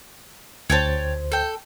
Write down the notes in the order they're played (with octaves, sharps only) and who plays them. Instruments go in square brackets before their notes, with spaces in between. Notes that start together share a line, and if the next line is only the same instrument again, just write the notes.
[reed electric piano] D2 C5 [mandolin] C#5 G5 A5
[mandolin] A4 G5